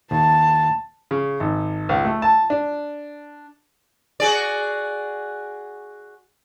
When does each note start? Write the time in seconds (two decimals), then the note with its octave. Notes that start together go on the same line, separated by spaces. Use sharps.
0.11 D#2 A5
1.11 C#3
1.40 G#1
1.89 C#2
2.05 A3
2.22 A5
2.50 D4
4.20 F#4 G#4 D5